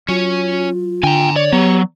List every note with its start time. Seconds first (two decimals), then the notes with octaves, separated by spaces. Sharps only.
0.08 F#3 C#4 F4 C#5
1.03 D#2 D3 G5 G#5 A#5
1.36 C#5 D5
1.53 F#3 B3 G4